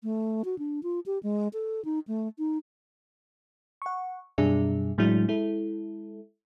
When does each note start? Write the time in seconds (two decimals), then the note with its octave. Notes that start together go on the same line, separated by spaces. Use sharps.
0.03 A3
0.45 F#4
0.59 D4
0.83 F4
1.06 G4
1.23 G#3
1.53 A4
1.85 D#4
2.08 A3
2.38 D#4
3.82 F#5 C#6
4.38 F#2 B2 G3 D4 G#4 E5
4.98 A2 F#3 G#3 D4 E4
5.28 G#3 E4 A4